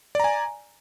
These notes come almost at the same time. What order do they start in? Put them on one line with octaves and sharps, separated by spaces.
D5 A#5 G#5